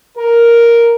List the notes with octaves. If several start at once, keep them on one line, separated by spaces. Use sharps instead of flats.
A#4